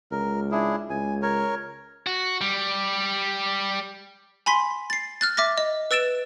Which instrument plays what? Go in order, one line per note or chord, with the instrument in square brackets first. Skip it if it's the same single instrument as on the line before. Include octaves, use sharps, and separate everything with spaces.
[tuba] C#2 [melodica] A#4
[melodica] D4 E4 G#4
[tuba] C#2 [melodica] G#5
[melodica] A#4 C#5
[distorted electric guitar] F#4
G3
[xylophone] G#5 B5 C6 B6
A6 C7
F6 F#6 A6
E5 D6 A6 A#6
D#5
B4 E6 A6 D7 E7